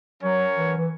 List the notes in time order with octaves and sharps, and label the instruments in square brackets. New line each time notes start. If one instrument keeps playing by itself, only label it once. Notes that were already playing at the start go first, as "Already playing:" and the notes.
[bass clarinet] F#3 [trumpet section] C#4 F#4 A#4 C#5
[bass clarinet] E3
E3